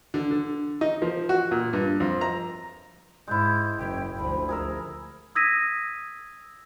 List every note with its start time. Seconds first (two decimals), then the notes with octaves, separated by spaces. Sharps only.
0.14 D3
0.31 D3
0.81 D#4
1.02 F3
1.29 F#4
1.51 A#2
1.73 G2
2.00 F2
2.21 A#5
3.27 G#2 G#3 E4 G6
3.78 F#1 G5
4.17 D2 F3 B5
4.49 G#4 A#4 E5
5.35 D#6 E6 G#6 A#6 B6 D#7